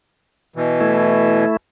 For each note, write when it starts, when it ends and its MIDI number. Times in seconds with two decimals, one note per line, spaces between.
0.56 1.45 47
0.56 1.45 52
0.81 1.57 57
0.81 1.57 64